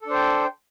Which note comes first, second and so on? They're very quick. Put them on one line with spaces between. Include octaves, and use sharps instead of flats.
A4 D4 C5 G5